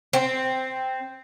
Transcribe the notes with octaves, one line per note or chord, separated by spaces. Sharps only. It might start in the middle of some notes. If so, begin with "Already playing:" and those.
C4